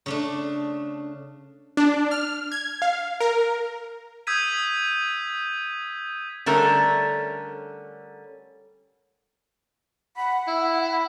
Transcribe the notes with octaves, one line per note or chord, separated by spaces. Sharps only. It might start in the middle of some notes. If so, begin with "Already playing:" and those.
C#3 A3 D4
D4
F6
G#6
F5
A#4
D#6 E6 G6 G#6 B6 D#7
D3 G3 A3 C#4 A4 A#4
F#5 B5
E4 E5
B5